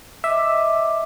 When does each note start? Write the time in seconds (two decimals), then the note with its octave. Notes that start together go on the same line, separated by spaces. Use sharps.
0.24 D#5 E5 D6